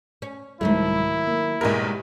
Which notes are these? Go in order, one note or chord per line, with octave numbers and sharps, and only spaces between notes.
C#4
C2 G#2 D#3 F#3 A3 E4
A#3
B1 E2 G3 G#3 A#4